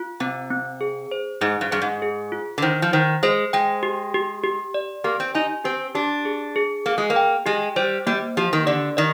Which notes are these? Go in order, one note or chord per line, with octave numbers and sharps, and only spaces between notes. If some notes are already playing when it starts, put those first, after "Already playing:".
Already playing: F4
C3 C4
C4
G#4
C5
G#2 G#4
G2
G2 G#4
G#2
G#4
F4
D3
D#3 C5
F3
D#3 C5
G#3 C5
G#3 G5
G4
G4
G4
D5
A#3 G4
C4
D#4 G#5
C4 G4
D4 G4
G#4
G#4
A#3 G#4
G#3
A#3
G5
G#3 G4
G3 C5
G3 A#3
F3 G4
D#3
D3 D5
D#3 D5